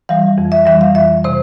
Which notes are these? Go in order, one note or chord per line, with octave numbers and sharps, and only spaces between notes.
E3 G3 F5
F2
E5
E3 G3 E5
F5
F2 E5
C3 C5